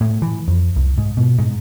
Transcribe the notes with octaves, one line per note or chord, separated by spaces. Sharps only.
A2
E3
F2
C2
G#2
B2
G#2